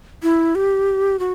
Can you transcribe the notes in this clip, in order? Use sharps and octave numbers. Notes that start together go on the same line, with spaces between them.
E4
G4
F#4